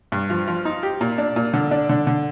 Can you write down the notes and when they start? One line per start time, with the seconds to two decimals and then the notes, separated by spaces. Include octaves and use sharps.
0.12 G2
0.30 F3
0.47 F3
0.65 D#4
0.83 G4
1.01 A#2
1.18 D4
1.36 A#2
1.54 D3
1.71 D4
1.89 D3
2.07 D3